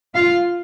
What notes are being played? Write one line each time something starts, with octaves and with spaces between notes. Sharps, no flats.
F4 F5